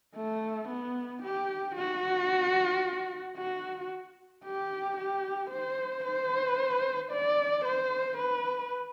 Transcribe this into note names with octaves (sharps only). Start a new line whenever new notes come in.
A3
B3
G4
F#4
F#4
G4
G4
C5
C5
D5
C5
B4